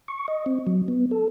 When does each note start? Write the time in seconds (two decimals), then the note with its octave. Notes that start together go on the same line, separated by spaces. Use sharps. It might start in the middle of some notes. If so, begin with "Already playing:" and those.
0.08 C#6
0.28 D#5
0.46 C4
0.67 F#3
0.88 B3
1.11 A4